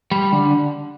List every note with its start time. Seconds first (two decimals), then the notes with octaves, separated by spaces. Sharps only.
0.11 G3
0.32 D3